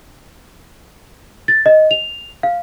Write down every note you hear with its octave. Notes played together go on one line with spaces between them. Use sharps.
A6
D#5
F7
F5